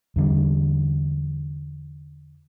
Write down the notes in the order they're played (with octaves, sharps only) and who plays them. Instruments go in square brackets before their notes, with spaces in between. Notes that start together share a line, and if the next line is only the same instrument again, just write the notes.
[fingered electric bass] E2 D3 G3